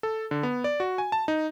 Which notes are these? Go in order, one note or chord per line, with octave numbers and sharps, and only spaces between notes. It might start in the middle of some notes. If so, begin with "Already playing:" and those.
A4
D3
B3
D5
F#4
G#5
A5
D#4